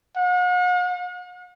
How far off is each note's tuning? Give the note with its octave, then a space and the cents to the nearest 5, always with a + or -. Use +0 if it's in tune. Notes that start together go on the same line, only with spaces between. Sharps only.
F#5 -45